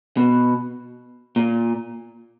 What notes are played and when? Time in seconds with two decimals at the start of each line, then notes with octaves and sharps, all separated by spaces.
0.17 B2
1.36 A#2